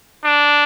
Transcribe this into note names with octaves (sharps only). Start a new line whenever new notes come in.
D4